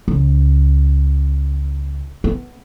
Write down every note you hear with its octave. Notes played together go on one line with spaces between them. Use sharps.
C#2
B3